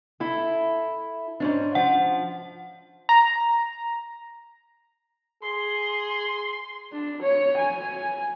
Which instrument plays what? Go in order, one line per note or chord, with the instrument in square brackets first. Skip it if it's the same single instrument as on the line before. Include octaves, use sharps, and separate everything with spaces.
[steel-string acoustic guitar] E4 A4
G#2 C#4 D4
[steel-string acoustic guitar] F3 [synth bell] F#5
[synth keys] A#5
[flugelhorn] G#4 [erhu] C6
[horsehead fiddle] D4
C#5
G#5